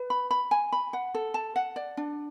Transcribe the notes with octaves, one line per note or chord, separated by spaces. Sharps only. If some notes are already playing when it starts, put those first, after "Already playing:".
Already playing: B4
B5
B5
G#5
B5
F#5
A4
A5
F#5
D5
D4